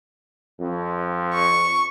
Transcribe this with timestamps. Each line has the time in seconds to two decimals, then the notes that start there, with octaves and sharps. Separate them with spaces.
0.60 F2
1.34 C#6